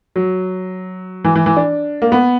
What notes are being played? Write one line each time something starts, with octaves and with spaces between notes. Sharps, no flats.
F#3
E3
E3
E3
D4
A#3
B3